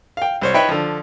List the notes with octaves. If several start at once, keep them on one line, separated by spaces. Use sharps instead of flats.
F5 G5
C2 C5 C#5
D#4 B4 C#5 E5 G5 B5
D3 F3